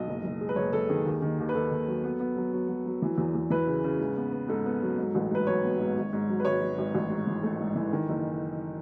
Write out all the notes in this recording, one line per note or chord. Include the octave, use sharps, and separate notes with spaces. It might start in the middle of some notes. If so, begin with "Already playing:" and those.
Already playing: B1 D#5
F#1
F#1
G#3
B4
F#1 C#5
F#1 A4
D#3 G#4
D#2
D#3
D#2
B4
D#2 A4
D#2
F#3
B3
B3
F#3
F#3
F#3
F#3
E3
E2
E2
E3 B4
C#3
C#3
G#2
B3
B3
G#2 A4
B3
F#3
G#2
A1
G#2 B4
F#3 C#5
B3
G#2
G#1
G#2
F#3
B4
G#1 C#5
F#3
G#1
A1
G#2
E3
A3 A4
G#2
E3
D#3
F#1